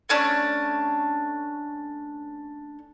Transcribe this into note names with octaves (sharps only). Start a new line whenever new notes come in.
A3 C#4 D4